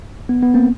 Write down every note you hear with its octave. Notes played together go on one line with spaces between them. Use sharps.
B3
B3
A#3 C4